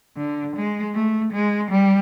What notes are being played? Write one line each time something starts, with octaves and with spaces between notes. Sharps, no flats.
D3
G#3
A3
G#3
G3